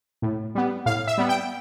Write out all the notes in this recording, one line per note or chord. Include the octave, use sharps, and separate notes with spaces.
A2
G3 B3
A2 F5
E5
G3 B3
G5